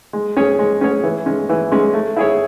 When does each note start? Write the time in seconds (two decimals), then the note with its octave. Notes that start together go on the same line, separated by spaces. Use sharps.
0.13 G#3
0.37 C#4 G#4 C#5
0.59 G#3
0.81 C#4 G#4 C#5
1.04 E3
1.26 G#3 C#4
1.49 E3
1.72 G#3 C#4
1.94 A3
2.17 E4 G#4 C#5